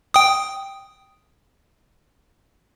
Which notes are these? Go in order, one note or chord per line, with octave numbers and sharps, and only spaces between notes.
G5 D#6